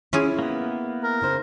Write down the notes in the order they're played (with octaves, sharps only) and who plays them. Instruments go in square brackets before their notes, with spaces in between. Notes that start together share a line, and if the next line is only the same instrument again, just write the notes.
[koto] C#4 F4 G#4 [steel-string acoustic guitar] E4
[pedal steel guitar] A#3 B3
[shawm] A#4
[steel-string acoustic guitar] C#3 D#4 C5